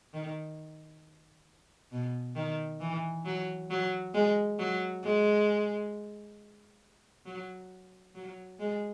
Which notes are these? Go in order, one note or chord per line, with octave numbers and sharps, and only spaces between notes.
D#3
B2
D#3
E3
F#3
F#3
G#3
F#3
G#3
F#3
F#3
G#3